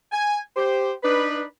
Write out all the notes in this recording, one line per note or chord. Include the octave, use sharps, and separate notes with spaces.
G#5
G4 C5
D4 D#4 B4